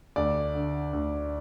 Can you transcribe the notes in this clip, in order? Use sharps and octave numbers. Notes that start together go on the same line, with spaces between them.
D2 D5
D3
D2